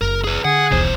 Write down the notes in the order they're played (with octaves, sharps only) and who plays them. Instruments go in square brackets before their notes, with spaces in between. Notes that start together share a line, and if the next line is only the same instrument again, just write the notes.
[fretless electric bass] F#1 [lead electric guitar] A#4
[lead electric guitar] G#4 B4
[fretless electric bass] D3 [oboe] G#4 [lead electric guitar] F#5
[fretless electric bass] D#1 B1 E2 [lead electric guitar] C#3 C5